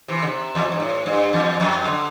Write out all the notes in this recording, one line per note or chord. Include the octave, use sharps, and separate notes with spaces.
C3 E3
D3
C3
E2
F2
G2
A2
G2
E2
F2
D3